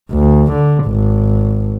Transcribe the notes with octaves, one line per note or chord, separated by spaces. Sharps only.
D2
D3
G#1